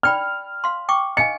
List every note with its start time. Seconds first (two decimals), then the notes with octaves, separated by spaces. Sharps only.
0.03 D5 G5 B5 F6
0.64 F5 C6
0.89 G5 C#6 D6
1.17 D#5 F5 G#5 C#7